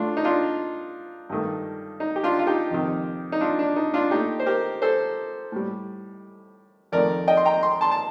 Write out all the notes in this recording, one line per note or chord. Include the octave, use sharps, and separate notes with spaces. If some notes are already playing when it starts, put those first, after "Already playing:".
Already playing: A2 A3 D4 F4
D#4
D4 F4
G2 D#3 A3
D#4
G4
D4 F4
F4
D#4 G4
F2 C3 D#3
D#4
D4 F4
D4
D#4
D4 F4
A#2 A3 D#4 G4
C5
G4 A#4
A4 C5
A2 G3
F2 D#3 A3 A#4 D5
D#5 G5
C6
G5 A#5
C6
A5 C6
A5